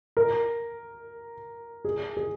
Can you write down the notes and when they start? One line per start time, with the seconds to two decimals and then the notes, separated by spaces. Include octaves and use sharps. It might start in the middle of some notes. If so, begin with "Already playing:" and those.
0.17 A#4
1.85 G#4
2.17 G#4